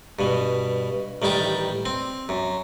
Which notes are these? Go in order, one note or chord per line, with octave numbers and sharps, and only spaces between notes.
G2 B2
A1 D#3 G3 G5 A5
C4
F#2